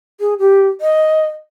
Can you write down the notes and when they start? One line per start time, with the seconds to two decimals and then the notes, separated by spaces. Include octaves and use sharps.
0.20 G#4
0.39 G4
0.81 D#5